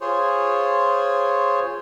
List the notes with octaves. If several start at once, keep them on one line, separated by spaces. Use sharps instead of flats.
F4 G#4 C5 C#5